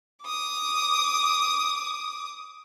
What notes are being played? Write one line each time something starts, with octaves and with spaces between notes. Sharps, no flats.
D6 D#6